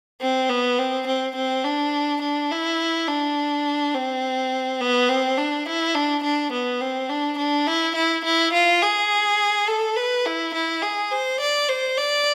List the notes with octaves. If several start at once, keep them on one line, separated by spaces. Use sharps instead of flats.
C4
B3
C4
C4
C4
D4
D4
E4
D4
C4
B3
C4
D4
E4
D4
D4
B3
C4
D4
D4
E4
E4
E4
F4
G#4
A4
B4
E4
E4
G#4
C5
D5
C5
D5